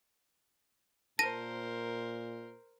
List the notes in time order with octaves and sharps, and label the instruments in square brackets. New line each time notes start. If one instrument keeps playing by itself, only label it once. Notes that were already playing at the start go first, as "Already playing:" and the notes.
[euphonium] A#2 [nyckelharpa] A#4 C5 [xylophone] A5 A#6 D#7